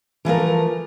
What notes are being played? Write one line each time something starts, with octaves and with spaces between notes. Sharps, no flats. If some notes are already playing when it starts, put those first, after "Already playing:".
E3 F3 A3 A#4